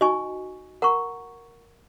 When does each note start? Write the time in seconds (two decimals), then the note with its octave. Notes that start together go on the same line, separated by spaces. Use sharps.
0.01 D#4 F#4 D#5 G#5 C#6
0.82 A#4 F#5 A#5 C#6